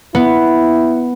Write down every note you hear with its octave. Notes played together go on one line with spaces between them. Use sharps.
B3 E4